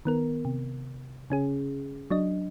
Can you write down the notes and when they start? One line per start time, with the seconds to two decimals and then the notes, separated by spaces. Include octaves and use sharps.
0.05 D#3 B3 A#4
0.45 C3
1.30 C#3 C#4 G#4
2.10 F#3 D4 D#5